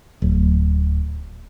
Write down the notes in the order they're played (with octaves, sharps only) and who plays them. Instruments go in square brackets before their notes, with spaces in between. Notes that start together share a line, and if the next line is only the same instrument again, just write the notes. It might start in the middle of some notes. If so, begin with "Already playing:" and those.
[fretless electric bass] D1